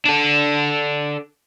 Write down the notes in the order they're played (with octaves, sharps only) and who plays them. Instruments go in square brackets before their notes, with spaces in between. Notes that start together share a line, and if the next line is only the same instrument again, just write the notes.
[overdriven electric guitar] D4 A4